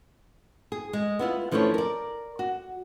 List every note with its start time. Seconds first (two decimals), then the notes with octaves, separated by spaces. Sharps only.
0.72 G#4
0.93 G#3
1.19 B3 E4 F4
1.51 E3 F3 A3 C#4 D4 C#5
1.74 A#4 D5
2.39 F#4